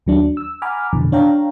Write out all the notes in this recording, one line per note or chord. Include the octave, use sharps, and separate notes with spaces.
D#2 F#3 D4
E6
F#5 G#5 A#5 B5 D6 F6
F2 B2 D3 E3
D4 C#5 F5 G5 A#5